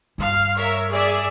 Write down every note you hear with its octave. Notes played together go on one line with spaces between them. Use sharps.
G2 F5
A#4 C#5 E5
G#4 D5 E5